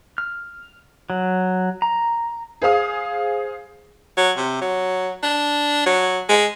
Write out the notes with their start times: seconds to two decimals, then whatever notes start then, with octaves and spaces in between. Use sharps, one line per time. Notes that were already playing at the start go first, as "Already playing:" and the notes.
0.18 F6
1.10 F#3
1.82 A#5
2.62 G#4 C5 F5 D#6
4.17 F#3
4.37 C3
4.61 F#3
5.23 D4
5.86 F#3
6.29 G#3